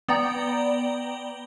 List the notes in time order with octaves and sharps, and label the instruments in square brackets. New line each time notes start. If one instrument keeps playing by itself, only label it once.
[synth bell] B3 D5 G5 A#5